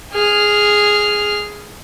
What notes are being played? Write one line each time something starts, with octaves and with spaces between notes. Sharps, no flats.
G#4 F6